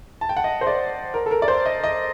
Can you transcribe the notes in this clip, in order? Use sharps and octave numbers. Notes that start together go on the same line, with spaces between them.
A5
G5
F#5
D#5
C5
D5
A#4
A4
A#4
D5
C5
D#5
D#5